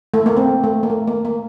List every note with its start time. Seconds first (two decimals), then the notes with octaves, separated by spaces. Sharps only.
0.14 A3
0.26 A#3
0.37 C4
0.64 A3
0.83 A#3
0.90 A3
1.08 A#3
1.25 A#3